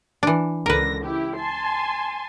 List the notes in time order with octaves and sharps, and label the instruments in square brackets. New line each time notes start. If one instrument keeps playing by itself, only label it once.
[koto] E3 D4
[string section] C#2 D3 A#6 [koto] A#4 B4
[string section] E4 G4
G#5 A5 C6